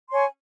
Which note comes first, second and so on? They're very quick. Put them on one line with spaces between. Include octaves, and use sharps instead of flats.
C6 C#5 G#5